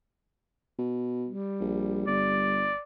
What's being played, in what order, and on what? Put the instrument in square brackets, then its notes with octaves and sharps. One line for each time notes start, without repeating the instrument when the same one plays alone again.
[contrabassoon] B2
[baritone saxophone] G3
[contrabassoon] A#1
[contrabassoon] G1 [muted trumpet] D5